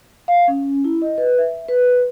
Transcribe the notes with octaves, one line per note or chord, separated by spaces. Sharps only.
F5
C#4
E4
D#5
B4
E5
B4